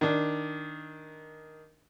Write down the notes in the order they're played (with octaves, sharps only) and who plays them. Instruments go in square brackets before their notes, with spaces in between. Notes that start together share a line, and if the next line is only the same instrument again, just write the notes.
[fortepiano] D#3 D4